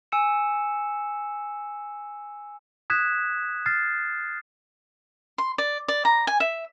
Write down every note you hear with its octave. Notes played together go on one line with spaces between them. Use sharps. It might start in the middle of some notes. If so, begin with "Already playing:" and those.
G#5 E6 C#7 E7
D#6 F#6 G#6 B6 E7
F6 A6 C7
C6
D5
D5
A#5
G#5
E5